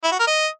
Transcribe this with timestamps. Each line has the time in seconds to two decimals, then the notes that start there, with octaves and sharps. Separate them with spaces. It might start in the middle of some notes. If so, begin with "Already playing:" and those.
0.04 E4
0.12 F#4
0.20 A#4
0.27 D#5